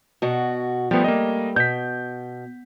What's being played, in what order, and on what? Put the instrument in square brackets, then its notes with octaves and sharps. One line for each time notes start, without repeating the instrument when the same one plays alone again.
[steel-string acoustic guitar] B2 F#4
[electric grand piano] F3 B3 [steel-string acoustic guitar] G3 A3
[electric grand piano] A#3 D#5
[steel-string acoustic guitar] B2 [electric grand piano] G6 B6